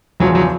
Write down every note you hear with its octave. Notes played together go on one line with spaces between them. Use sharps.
E2 C#3 F3 F#3
F#3